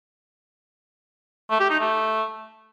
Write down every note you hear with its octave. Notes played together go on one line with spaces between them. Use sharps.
A3
G4
D#4
A3